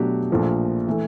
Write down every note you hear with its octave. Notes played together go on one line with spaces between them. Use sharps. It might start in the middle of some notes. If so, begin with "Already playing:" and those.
Already playing: B2 F#3 A3 D4 G4
A#1 A#2 F3 A3
E3 A3